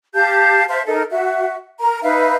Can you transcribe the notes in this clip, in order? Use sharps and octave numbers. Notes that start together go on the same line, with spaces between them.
G4 F5 A5 G6
C5 E5 F5 A5
D#4 A4 A#4
F#4 E5
A#4 A#5
D#4 B4 E5 F5